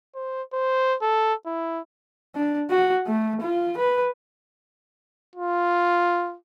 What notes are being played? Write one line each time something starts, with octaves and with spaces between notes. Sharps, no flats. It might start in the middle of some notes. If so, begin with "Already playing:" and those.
C5
C5
A4
E4
D4
F#4
A3
F4
B4
F4